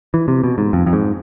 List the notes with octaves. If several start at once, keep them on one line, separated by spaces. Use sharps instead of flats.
E3
C3
B2
G#2
F2
F2
G#2